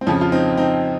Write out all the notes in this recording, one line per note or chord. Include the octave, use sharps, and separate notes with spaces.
C4
F2 C#3 F3 C#4
F4
C4 D#4
C4 D#4